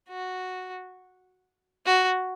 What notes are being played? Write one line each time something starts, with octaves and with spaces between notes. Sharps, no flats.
F#4
F#4